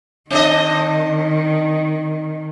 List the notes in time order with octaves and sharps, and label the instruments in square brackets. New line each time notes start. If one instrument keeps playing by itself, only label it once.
[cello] D#3 [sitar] C4 D4 D#5